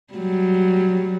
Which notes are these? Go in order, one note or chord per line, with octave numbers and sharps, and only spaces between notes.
F#3 G3